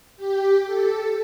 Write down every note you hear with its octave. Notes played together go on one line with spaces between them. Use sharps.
G4
A4